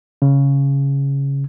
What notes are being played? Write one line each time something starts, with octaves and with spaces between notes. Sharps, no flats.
C#3